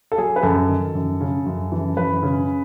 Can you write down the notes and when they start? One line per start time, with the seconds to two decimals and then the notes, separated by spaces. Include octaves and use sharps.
0.12 A4
0.18 F#3 G#4
0.36 B4
0.43 F#2 A4
0.68 D#3
0.95 F#2
1.21 C#3
1.46 F#2
1.72 E3
1.97 F#2 B4
2.23 C#3